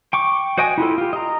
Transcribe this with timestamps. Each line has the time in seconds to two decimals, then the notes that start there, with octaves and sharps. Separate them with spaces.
0.13 G5 C#6 D6
0.58 F#4 C5 D#5 G5 G#5
0.78 E4 F4 A4
0.98 F4 G4
1.13 D#5 A#5